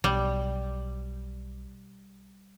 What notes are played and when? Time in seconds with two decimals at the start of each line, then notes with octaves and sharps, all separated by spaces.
0.04 B1 G3